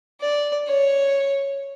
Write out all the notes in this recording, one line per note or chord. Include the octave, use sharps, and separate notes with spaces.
D5
C#5